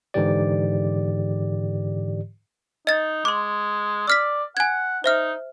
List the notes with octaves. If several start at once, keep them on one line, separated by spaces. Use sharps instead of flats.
G#2 D3 E3 G4 D5
D#4 D#5 A6
G#3 C6 D6
D5 E6 F6 B6
F#5 G#5 G#6
D#4 C5 E5 F6